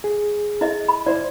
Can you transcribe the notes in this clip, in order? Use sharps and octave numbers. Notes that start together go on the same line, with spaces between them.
G#4
E4 D#5 E5
B5
E4 C5 D5